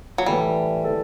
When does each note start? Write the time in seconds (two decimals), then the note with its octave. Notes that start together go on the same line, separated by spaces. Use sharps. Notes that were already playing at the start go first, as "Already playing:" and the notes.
0.18 F#3
0.26 A2 E3 G3 A3 E4
0.84 E3 A3 E4 A4